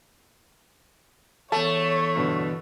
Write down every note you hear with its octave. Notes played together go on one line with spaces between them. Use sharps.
E2 A3 C#5 A5
G2 B2 D3